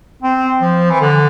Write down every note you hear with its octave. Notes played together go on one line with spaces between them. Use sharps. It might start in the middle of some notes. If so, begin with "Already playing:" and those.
C4
F3
E3
D3